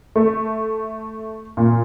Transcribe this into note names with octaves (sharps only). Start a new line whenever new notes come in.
A3
A#2